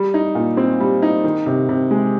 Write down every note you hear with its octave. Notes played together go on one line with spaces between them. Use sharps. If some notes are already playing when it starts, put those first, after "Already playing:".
Already playing: G3
D#4
A#2
C4
G3
D#4
D#3
C3
C3
G#3